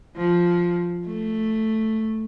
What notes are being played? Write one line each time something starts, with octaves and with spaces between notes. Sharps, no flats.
F3
A3